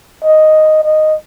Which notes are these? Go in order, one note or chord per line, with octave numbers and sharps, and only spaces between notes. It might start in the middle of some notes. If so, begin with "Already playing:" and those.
D#5
D#5